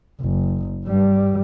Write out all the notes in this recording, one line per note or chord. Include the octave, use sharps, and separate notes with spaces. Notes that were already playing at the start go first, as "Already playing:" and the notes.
F#1
G2 G3